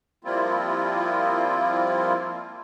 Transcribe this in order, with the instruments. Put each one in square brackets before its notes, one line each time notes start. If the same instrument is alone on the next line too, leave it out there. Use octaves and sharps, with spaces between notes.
[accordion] F3 G3 A#3 C4 E4 F4